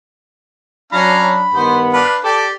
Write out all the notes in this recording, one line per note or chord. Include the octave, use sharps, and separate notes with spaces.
F#3 C#4 D4 F5 A#5 B5
G2 D#3 B3 C5
D4 B4 F5
G4 A4 D5 G5